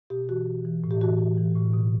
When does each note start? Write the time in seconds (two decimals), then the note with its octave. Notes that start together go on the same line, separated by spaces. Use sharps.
0.10 B2 G4
0.29 E3 F#4
0.47 E3
0.65 E3
0.84 A2
0.91 G4
1.01 E3 F#4
1.19 E3
1.38 E3
1.56 A2
1.73 B2